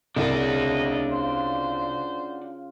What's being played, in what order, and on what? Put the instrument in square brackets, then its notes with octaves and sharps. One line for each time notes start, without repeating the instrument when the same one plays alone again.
[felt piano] C2 [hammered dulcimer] C#3 [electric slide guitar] D4 F#4 D5 [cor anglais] D#5
[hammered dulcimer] F4 [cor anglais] C5